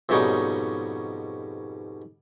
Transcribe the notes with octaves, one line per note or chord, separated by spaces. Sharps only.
F2 G#2 B2 G3 C#4 D#4